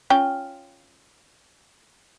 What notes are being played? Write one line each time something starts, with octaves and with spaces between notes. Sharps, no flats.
C#4 F4 G5